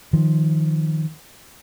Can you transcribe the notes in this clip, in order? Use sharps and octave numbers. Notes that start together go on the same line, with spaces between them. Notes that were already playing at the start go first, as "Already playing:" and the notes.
D#3 F3